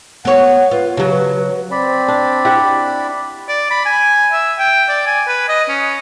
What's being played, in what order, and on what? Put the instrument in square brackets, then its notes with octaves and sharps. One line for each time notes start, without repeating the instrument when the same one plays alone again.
[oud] B3 C#5 [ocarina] F#5
[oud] F4 [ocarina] B4
[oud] C#3 F#3 [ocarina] G4
[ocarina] B4
[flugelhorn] C4 [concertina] D5 B5
[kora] D4
E4 G4 F#5
[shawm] D5
B5
G#5
E5
G5
D5
G#5
B4
D#5
C#4